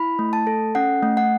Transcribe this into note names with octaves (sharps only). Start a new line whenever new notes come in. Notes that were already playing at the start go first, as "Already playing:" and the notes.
Already playing: E4 B5
A3
A5
A4
C#4 F#5
A3
F#5